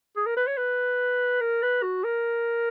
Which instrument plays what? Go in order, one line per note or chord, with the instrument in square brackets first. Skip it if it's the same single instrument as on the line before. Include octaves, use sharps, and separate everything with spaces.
[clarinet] G#4
A#4
B4
C#5
B4
A#4
B4
F#4
A#4